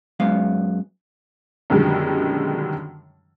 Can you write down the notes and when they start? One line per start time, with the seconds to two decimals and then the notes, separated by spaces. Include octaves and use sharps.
0.20 F#2 G#3 B3 F5
1.70 F#2 B2 D3 D#3 G3 G#3